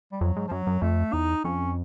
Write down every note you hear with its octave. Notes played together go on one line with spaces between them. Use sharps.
G3
F2 F#3
G#2
F3
F#2 F#3
F#2
F2 A3
E2 D#4
F2 C#4